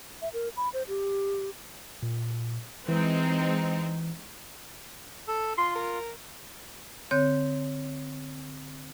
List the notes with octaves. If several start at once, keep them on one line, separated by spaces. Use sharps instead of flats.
E5
A#4
B5
C5
G4
A#2
E3 G#3 C4 D#4
A4
F4 C6
A#4
D3 C4 C#5 G6